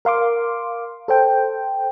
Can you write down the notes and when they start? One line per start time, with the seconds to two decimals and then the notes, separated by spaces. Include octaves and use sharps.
0.05 A#4 F5 C6 D6
1.08 A4 C5 G5